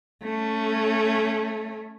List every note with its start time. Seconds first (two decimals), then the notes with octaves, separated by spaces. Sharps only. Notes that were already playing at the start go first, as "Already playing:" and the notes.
0.23 A3 C#4